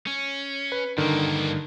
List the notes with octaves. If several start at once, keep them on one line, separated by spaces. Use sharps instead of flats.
C#4
B4
G2 D3 D#3 A#3